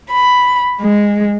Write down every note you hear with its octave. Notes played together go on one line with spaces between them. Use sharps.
B5
G#3